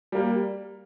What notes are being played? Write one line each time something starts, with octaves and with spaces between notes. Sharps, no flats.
G3 A#3